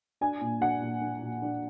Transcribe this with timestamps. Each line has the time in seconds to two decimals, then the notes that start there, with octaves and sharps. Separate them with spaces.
0.21 D4 G#5
0.41 A#2
0.61 D4 F#5
0.82 A#2
1.01 D4
1.22 A#2
1.42 D4